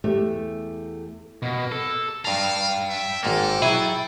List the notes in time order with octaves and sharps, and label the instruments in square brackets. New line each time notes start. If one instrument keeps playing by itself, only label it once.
[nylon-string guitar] E2 A3 G4 E5
[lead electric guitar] B2 [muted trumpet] A#3
[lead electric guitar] A4
[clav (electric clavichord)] G2 A#5 [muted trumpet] F5 [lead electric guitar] G5 A5
[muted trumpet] E5
[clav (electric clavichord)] G#1 G#2 A#3 [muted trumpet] A4
[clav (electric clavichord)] F#3 G#4 [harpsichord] E4